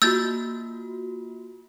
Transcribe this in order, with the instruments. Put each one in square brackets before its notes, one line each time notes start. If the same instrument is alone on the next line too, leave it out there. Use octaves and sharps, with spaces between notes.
[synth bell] A#3 F4 F#4 [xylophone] E6 G6 A6